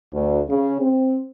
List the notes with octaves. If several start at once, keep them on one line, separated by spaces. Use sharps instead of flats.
D2
C#3
C4